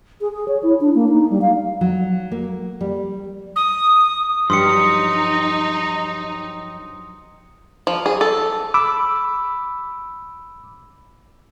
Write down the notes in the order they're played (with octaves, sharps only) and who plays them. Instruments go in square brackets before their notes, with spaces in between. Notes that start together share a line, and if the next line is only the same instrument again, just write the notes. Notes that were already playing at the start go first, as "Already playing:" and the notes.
[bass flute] G#4
G#4
C#5
E4
D4
A#3
D#4
G3
F5
[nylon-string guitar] F#3
A#3
G3
[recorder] D#6
[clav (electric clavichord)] G2 [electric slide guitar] F3 F#3 G4 [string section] D#4 [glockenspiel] C6 D#6 C#7
[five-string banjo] F3
G#4
A4
[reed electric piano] B5 D6 E6